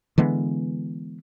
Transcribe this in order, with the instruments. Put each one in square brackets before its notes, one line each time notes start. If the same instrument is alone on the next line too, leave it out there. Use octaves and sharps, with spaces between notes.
[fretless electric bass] D3 E3 G#3 B3